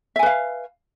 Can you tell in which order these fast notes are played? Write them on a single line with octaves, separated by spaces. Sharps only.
E5 G#5 B4 F5